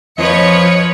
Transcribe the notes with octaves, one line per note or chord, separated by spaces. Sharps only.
F2 F3 B4 C#5 D#5 C#7